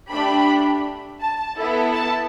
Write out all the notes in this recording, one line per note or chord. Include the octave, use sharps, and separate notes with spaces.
A3 D4 G4 B5
A5
B3 E4 A4
A5